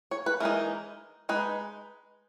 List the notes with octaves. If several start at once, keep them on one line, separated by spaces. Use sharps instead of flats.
C#5
B4
E3 G#3 D#4 A#4
G#3 D#4 B4